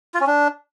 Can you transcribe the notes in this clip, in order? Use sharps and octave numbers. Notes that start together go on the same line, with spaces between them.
F4
C#4
D4